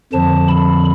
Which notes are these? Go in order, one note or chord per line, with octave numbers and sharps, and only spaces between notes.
F2 D3 F3 A5
B5